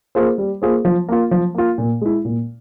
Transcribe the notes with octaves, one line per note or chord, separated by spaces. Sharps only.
A#3 F4 G#4 C5
G3
A#3 F4 G#4 C5
F3
A#3 F4
F3
A#3 F4
A#2
G#3 E4
A#2